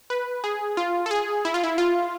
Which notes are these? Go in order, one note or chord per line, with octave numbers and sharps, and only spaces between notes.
B4
G#4
F4
A4
G#4
E4
F4
E4
F4